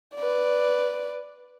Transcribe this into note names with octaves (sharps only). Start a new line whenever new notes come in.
B4 D5